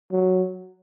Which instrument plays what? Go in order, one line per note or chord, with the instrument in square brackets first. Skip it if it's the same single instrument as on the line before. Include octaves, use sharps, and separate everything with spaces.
[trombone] F#3